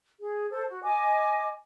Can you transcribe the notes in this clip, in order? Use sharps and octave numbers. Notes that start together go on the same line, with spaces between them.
G#4
A4 C5
F#4
D#5 G#5 D6